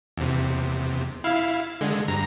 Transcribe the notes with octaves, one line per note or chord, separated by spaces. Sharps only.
E2 C3
E4 F5
D3 G#3
G2 A#5